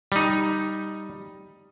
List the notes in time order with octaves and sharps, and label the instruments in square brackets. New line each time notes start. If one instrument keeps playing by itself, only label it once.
[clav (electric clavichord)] G3 D#4